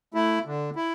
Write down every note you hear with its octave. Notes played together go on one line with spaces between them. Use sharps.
A3 E4
D3
E4